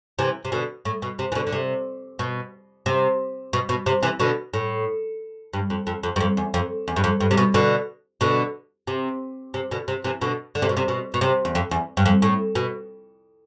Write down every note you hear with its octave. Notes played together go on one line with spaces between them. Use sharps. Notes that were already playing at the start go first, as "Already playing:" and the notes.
C3 E3
C3
B2 D3
A2
B2
C3
E3
B2 D3
D3
C3
B2
C3
B2
B2
C3
C3 E3
B2 D3
A2
G2
F2
F2
F2
G2
F2
E2
F2
E2
G2
F2
G2
C3
B2
B2 D3
B2 D3
C3
C3
B2 D3
C3
C3 E3
B2 D3
D3
C3
B2
C3
B2
B2
C3
E2
F2
E2
G2
F2
A2
B2